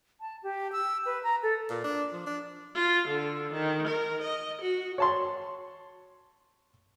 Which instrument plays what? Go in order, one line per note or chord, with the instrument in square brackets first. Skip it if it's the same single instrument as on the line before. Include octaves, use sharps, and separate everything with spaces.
[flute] A5
G4
E6
B4
A#5
A4
[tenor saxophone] A#2
D4
F3
D4
[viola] F4
D3
D#3
A#4
D#5
F#4
[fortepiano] C#5 A5 C6